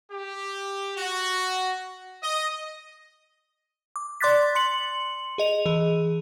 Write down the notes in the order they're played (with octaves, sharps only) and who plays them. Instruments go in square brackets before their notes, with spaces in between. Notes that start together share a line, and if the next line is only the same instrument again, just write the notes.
[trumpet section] G4
F#4
D#5
[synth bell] D6
D5 C6 D6 F#6 A6 B6
C6 C#7 F#7
G#4 D#5 F7
E3 G#4